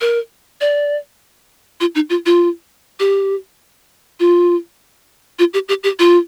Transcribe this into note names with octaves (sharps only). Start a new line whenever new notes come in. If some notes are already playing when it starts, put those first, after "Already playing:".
A#4
D5
F4
D#4
F4
F4
G4
F4
F4
G4
G4
G4
F4